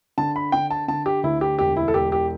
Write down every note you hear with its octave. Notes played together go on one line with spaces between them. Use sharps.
D3 A5
B5
D3 G5
A5
D3 A5
G4
D2 E4
G4
E1 G4
E4
A4
E1 G4
G4